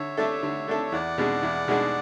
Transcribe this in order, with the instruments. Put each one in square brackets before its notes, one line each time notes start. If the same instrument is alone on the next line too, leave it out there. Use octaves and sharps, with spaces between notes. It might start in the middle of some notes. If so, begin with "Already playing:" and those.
Already playing: [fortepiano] D3 [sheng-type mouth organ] C#5 E5
[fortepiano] A3 D4 A4
D3
A3 D4 A4
[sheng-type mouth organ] E5
[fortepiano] E2 [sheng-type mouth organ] D5 F#5
[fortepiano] B2 G#3 D4 G#4
E2
B2 G#3 D4 G#4